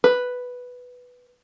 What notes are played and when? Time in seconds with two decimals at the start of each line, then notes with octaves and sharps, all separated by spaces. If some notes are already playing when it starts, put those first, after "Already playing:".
0.04 B4